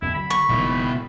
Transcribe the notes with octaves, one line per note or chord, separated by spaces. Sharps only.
F2 B2 E4
D3 F#3 B5
C#6
F#1 B2 D#3 F3 E4